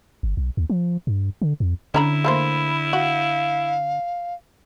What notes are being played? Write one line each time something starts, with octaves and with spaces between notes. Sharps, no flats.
G1
B1
D#2
F3
G2
D3
F2
D3 C#4 E4 A#5 B5
A3 A#3 C5 B5
F#4 F5